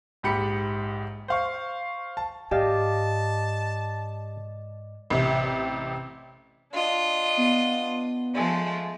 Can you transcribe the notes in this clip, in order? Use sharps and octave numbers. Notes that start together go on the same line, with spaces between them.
A#1 G#2 G4 B5 C#7
C5 F5 C#6
A5
G#2 G4 D5 D#5 F5 A5 D6
A1 C3
D4 F4 D#5
B3
F3 G#3 A3